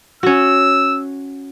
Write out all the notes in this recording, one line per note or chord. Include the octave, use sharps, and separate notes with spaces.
C#4 F#4 E6